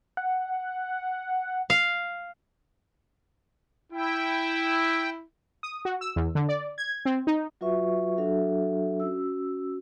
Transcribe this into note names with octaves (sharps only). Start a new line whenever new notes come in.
F#5
F5
E4 G5
D#6
F#4
E6
E2
D3
D5
G#6
C4
D#4
F#3 F4 F#4 B4 E5 C#6
F#3 D4 F#4 A4 E5
C#4 F#4 E6